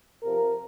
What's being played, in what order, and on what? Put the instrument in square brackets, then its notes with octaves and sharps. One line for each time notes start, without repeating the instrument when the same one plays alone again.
[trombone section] C3 F3 A#4